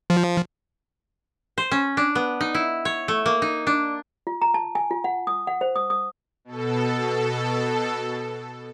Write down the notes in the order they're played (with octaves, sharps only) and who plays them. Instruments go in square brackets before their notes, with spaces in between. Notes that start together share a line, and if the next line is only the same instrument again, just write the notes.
[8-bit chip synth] F3
[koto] C5
C#4
D4
B3
D#4
E4
C#5
A3
A#3
D#4
D4
[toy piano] F4
A#5
A5
G#5
F4
F#5
D#6
F#5
C5
D#6
D#6
[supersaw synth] B2 A4